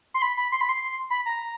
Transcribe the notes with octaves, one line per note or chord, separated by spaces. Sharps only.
C6
B5
B5
C6
B5
C6
B5
A#5